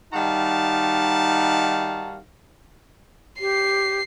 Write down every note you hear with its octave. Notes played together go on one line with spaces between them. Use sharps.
D#3 G3 D#4 F#4 F5 A5
G4 C7